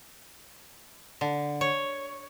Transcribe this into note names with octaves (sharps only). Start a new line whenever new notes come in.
D3
C#5